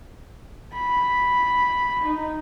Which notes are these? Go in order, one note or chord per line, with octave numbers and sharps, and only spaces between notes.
B5
D#4